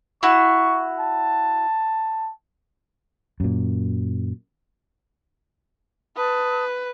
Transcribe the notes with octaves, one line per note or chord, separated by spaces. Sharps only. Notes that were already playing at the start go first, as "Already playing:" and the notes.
E4 F#4 C#6
A5
F#2 A#2
B4 A5 D#6